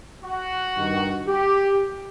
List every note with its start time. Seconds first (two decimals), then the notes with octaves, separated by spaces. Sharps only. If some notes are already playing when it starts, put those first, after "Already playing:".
0.23 F#4
0.76 G2 D#3
1.28 G4